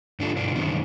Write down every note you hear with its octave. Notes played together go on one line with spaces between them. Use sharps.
G#2 D3 D4 F4 A4
G2 B2 D4
F#2 D3 D#3 B3